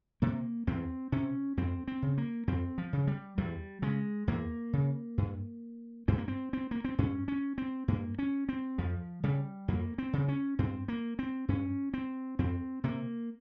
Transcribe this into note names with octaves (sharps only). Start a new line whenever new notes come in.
C3 A#3
E2 C4
C3 C#4
F2 C4
C4
C#3
A#3
F2 C4
F3
C#3
G3
E2 G3
C#3 G#3
E2 A#3
C#3
G2
G2 C4
A#3
C4
C4
A#3
C4
G2 C#4
C#4
C4
G2 A#3
C#4
C4
F2 F3
C#3 G3
F2 A#3
C4
C#3
C#4
G2 C4
A#3
C4
G2 C#4
C4
F2 C4
C3 A#3